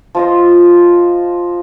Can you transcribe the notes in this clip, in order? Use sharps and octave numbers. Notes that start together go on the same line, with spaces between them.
F3 F4 D#5